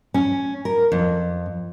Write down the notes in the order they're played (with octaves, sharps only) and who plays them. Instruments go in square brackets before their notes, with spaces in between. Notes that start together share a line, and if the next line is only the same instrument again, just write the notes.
[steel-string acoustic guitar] C#4
A#4
F2